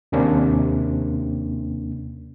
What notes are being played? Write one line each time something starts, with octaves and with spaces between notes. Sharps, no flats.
D#2 C3 A#3 C#4 D4